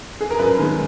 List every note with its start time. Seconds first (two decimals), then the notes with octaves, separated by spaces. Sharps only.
0.21 G#4
0.30 A#4
0.39 F#2 B4
0.58 D#3 G#3